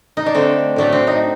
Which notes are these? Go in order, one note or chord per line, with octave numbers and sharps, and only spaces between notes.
D#4
D4
D3 A3 C4
A2 F#3 A3 D4
C4
D#4